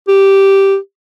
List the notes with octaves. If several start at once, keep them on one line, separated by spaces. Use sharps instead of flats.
G4